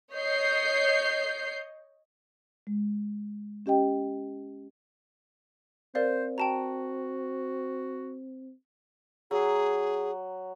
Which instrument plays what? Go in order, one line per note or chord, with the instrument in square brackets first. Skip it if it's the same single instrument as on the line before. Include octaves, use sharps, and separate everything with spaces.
[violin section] C#5 D#5 G6 C7
[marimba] G#3
C#4 G4 D#5 G5
[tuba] C4 [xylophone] A#4 D5 F5 [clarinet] C5
[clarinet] F#4 [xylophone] G5 A5 A#5
[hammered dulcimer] F#3 [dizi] G#4